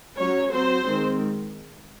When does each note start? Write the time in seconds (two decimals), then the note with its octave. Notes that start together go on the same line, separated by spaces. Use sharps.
0.17 F#3 C#4 C#5
0.51 F#3 C4 C5
0.85 D#3 G#3 C4